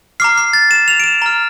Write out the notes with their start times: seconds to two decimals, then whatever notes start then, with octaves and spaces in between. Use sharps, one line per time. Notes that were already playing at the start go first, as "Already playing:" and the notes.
0.20 A#5 D6 F6 C7
0.38 C7
0.53 A6
0.71 E7
0.88 F7
1.00 D7
1.04 E7
1.22 A#5 F6